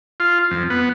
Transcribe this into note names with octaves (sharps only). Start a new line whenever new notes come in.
F4
F2
B3